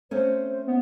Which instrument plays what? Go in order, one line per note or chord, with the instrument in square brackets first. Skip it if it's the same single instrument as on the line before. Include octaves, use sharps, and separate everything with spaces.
[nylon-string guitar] A3 C4 C#4 [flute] C5
[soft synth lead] B3